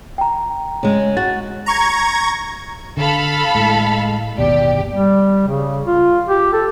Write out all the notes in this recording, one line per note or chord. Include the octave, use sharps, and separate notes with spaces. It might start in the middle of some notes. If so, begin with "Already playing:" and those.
G5 A#5
C#3 G#3
F#4 A6
A#5 C#6 G#6
D3 A4 F5 B5
A2 G#3
G1 D#2 B2 G4 D5
G3
C#3
F4
G4
A4